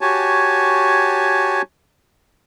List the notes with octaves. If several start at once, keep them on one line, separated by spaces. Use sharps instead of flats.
F#4 G4 C#5 G#5 A5